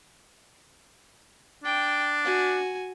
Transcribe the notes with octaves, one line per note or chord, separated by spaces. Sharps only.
D4 G5
F#4 G#5